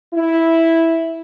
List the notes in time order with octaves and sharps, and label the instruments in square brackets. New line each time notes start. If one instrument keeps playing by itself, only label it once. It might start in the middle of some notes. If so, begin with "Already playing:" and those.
[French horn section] E4